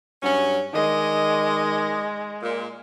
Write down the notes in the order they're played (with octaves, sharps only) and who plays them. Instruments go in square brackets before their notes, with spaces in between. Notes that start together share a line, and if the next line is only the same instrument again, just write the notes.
[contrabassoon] G2 [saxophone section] F#3 C#4
[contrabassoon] D#3 [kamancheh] G#3 [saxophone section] D5 D#5
[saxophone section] A#2